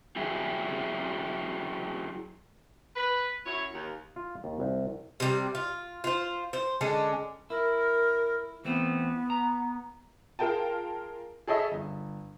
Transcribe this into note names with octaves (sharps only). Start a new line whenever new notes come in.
F#3 E4 G4 G#4
B4
F#2 E4 C#5
D#2
F4
D#2
C2
C3 G3
F4
F4 C5
C5
D3 G#3 C#4 D4
E4 A#4
E3 A3 B3 C4
A#5
F4 G#4 A#4 F5 G5 A5
G#4 A4 C#5 D#5 E5 B5
G1